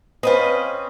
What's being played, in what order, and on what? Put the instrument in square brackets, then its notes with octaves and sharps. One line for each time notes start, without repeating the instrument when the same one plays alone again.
[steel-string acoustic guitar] C4 C#4 [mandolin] F4 B4 D#5